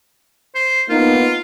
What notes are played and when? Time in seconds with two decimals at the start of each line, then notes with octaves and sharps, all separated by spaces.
0.55 C5
0.89 A#3 B3 D#4 F4